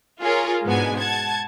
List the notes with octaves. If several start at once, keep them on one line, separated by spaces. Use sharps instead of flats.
F4 G#4 A#4 C#5
G#2 B2 G#3 B3 D4 G#5
F#5 A5 G#6